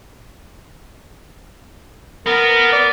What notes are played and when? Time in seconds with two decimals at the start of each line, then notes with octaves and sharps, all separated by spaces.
2.27 B3 A#4
2.72 D5